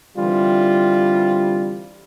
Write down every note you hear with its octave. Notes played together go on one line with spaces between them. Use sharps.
D3 E3 G3 C4 F4